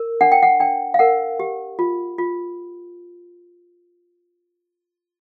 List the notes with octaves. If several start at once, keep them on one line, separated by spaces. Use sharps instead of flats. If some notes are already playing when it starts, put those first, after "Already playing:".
Already playing: A#4
D4 F#5
G5
F#5
D4 G5
F5
A#4 F#5
G4
F4
F4